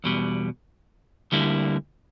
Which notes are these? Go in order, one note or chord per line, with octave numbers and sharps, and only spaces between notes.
E2 B2 G3
D2 D3 G3 A#3 E4